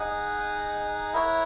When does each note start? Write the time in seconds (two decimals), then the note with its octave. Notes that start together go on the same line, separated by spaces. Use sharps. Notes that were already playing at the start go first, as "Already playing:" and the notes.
Already playing: D#4 G#4 D#5 F#5
1.13 E4 A#4 C#5 F#5